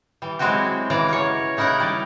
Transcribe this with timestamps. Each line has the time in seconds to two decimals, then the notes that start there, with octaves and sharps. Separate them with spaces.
0.22 E3 G3
0.39 F#3 G#3 C4 E4 F#4 G4
0.90 C#3 E3 C#4 D5 A#5
1.09 A#4 C#5
1.57 C#3 D#4 E4 A#4 F#5 A#5
1.80 G3 D5